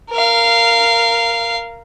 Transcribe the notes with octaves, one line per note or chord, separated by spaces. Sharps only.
A#4 F5